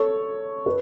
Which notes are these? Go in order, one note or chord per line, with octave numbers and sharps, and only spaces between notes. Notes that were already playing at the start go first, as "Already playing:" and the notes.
Already playing: A4 C#5
B4